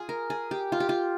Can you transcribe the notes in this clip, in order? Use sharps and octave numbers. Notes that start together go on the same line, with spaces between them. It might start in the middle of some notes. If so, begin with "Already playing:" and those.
Already playing: F4 G#4
A#4
G#4
G4
F4
G4
F4